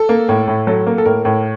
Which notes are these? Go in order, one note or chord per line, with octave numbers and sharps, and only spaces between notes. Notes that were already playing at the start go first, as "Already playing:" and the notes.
Already playing: A4
A#3
A2
A2
F#3 A4
A#3
A4
A2 A#4
A2